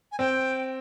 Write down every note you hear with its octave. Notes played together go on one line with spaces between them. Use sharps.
G#5
C4 G5